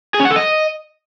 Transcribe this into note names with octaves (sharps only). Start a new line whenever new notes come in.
G#4
C#4
F#5
A4
D#5